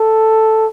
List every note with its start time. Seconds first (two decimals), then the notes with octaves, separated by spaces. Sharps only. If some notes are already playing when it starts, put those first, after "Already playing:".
Already playing: A4